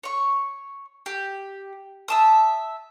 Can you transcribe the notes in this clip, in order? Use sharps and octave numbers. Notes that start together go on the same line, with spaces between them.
C#5 C#6
G4
E5 A5 D#6